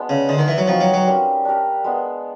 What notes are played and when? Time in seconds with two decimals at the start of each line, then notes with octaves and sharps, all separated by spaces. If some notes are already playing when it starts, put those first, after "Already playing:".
Already playing: G#3 B3 D4
0.09 C#3
0.28 D3 D#4 G#4 C5 E5
0.38 D#3
0.48 E3
0.58 F#3
0.68 F3 C4 D#4 F#4 B4
0.81 F#3
0.94 F#3
1.06 G3 A#3 C#4
1.45 D4 G4 A#4
1.84 G#3 B3 D4